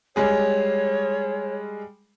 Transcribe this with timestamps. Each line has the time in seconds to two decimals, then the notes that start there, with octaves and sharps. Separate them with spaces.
0.16 G3 G#3 G#4 C#5